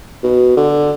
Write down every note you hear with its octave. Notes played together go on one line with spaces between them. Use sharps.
B2
D3